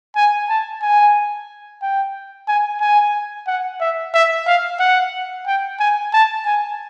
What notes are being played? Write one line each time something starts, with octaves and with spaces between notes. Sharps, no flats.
G#5
A5
G#5
G5
G#5
G#5
F#5
E5
E5
F5
F#5
G5
G#5
A5
G#5